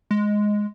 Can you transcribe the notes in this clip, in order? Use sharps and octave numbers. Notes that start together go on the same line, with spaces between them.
G#3